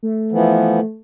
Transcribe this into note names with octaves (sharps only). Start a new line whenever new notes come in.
A3
E3 F3 B3